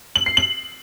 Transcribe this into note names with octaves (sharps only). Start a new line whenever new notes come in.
F#7
C7
F#7